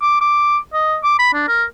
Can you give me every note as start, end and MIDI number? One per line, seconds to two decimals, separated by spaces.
0.01 0.20 86
0.21 0.57 86
0.73 0.96 75
1.03 1.17 86
1.19 1.33 83
1.33 1.44 62
1.48 1.64 70